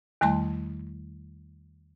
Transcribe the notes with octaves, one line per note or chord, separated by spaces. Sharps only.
E2 D#3 G3 A3 A5 C6